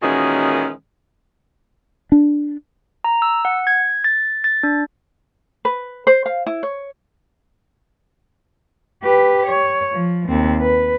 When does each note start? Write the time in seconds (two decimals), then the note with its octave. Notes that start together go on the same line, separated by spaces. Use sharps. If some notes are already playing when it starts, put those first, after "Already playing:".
0.02 A#2 D#3 E3 G#3 C#4 F#4
2.12 D4
3.04 A#5
3.22 E6
3.45 F#5
3.67 G#6
4.04 A6
4.44 A6
4.63 D4
5.65 B4
6.07 C5
6.26 F5
6.47 E4
6.63 C#5
9.03 G4 B4
9.47 C#5
9.93 F3
10.28 D#2 C4
10.61 B4